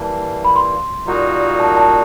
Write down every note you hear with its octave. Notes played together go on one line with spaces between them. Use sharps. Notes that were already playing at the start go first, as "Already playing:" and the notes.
Already playing: E3 G3 A#3 A5
B5
C6
A#2 G3 A#3 D#4 F#4
A5
A5